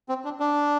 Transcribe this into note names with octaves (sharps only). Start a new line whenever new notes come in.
C4
D4
D4